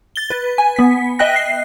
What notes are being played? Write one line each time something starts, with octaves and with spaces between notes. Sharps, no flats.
A6 G7
B4
G#5
B3 B6
D#5 E5 G5 F#6 A#6
C7